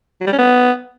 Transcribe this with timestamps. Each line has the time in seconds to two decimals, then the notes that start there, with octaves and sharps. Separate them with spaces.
0.21 F#3
0.27 G3
0.33 C#4
0.39 B3